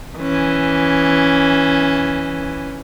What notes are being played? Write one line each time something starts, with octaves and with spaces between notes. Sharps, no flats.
E3 C#4